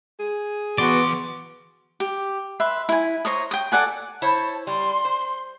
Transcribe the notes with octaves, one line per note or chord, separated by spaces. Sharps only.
G#4
E3 B3 F#4 D5 C6
G4
B4 E5 C6
E4 G#5
C5 C#5 A#5 D#6
G5 D#6
A4 D5 F#5 G#5
E4 C5 C#5 A5
G3 C6
C5